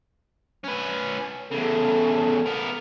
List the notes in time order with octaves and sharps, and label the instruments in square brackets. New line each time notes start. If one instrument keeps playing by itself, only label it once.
[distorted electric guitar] C#4 B4
[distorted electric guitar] E2 C#3 [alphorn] A4
[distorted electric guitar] B3 A#4